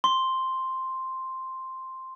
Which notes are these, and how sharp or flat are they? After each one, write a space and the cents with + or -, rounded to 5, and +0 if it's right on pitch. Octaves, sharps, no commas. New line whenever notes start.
C6 +0